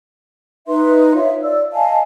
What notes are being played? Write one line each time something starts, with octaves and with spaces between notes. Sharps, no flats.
D#4 B4 E5 C6
F4 C#5 E5 F5
D5 E6
D#5 F5 G#5 A5